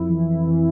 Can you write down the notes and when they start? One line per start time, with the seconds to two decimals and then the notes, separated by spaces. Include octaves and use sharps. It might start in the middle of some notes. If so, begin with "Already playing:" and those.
Already playing: F2 E4
0.09 E3
0.47 E3